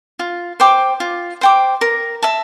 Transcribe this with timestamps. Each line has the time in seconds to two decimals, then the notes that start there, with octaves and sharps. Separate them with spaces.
0.19 F4
0.60 C5 G5 D6
1.00 F4
1.41 C5 G5 D6
1.81 A#4
2.22 E5 A5